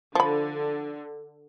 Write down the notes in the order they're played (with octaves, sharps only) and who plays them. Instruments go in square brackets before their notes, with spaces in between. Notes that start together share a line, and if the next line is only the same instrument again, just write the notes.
[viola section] D3 [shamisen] F3 B5